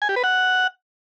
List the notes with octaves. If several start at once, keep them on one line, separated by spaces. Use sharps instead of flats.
G#5
G4
B4
F#5